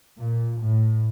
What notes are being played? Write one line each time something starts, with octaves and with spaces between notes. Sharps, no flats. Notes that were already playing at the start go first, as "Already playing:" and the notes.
A#2
A2